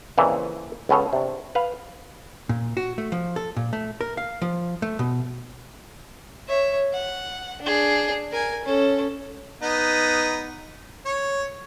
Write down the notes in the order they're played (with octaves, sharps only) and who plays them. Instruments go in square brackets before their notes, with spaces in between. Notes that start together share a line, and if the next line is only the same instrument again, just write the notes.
[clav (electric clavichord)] F2 A#2 C#3 E3 E4
C#2 B3 C#4 A4 C#5
C3 D4
B4 F5
[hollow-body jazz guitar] A#2
F#4
A3
F3
A4
A#2
A3
A#4
F5
F3
A3
B2
[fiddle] C#5 E5
F#5
D4 G#4
A#4 G#5
C#4 A4
[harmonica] B3 D#4
C#5